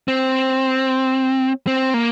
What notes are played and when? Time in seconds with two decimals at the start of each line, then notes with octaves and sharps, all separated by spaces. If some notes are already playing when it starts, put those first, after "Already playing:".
0.08 C4
1.67 C4
1.94 A#3